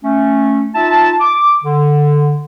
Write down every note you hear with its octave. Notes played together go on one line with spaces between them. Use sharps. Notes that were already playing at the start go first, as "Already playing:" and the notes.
A3 C#4
D#4 F4 E5 A5
D6
D3